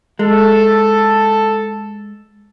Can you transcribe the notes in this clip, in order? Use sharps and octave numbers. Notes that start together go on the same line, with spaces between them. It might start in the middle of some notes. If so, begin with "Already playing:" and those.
G#3 A4